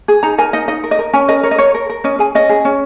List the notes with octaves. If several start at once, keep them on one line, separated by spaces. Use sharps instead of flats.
G#4
D#4 A#5
A#4 G#5
D#4 D#5
D#4 D#5
A#4
D#5
A#4
C#4 G#5
A#4 D#5
A#4 C#5
D#5
A#4 C#5
A#4
A#4
C#4 D#5
G#4 G#5
C#4 D#5
G#4
C#4